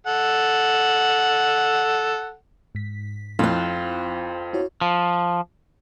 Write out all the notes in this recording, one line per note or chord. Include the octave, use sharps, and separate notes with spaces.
A4 F#5
G#2 B6
F2 F3 C4 E4 F4 F#6
E4 F#4 C#5
F3